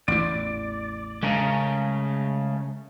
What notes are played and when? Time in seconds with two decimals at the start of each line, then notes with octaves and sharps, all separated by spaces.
0.08 A1 E2 E3 D5
1.23 C#3 G#3 A3 A#4